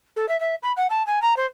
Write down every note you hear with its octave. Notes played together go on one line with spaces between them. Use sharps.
A4
E5
E5
B5
F#5
A5
G#5
A#5
C5